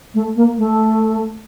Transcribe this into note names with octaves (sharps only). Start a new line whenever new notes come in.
A3
A#3
A3